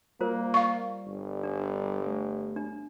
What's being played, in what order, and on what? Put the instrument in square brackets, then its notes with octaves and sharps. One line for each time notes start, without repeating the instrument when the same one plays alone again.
[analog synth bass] G3 [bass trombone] A#3 [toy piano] F4 A#4 C5
[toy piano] D#5 [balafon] F5 C#6
[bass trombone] G1
[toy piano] D4
[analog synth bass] A3
[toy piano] D4